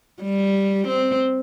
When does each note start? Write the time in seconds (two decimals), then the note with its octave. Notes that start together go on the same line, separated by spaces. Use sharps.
0.22 G3
0.88 C4